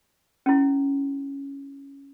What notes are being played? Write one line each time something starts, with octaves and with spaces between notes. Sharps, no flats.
C#4 E4